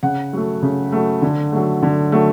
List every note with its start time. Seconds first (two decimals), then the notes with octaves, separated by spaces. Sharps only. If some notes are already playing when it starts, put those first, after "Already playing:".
0.03 C#3 F#5
0.33 F#3 A3
0.63 C#3
0.92 F#3 A3
1.22 D3
1.52 F#3 A3
1.83 D3
2.12 F#3 A3